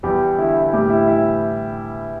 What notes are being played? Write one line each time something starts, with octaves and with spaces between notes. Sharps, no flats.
E2 G3 G4
D3 E4
E4
A2 G3 G4
E4
E3 E4